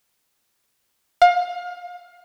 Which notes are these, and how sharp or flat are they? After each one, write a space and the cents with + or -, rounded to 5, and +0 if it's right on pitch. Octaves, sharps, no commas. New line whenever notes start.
F5 +30